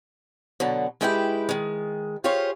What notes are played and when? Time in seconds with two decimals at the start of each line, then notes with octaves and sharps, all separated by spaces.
0.60 B2 D3 F#3
1.01 G#3 D#4 E4 G4 B4 G5
1.49 D#3 G#3
2.24 F4 G4 G#4 C5 C#5 F5